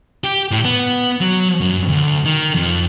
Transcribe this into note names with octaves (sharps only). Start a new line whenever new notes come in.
G4
A2
B3
F#3
F#2
D2
D#3
F2